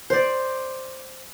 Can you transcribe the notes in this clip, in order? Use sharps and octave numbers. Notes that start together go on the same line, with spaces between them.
C5 D5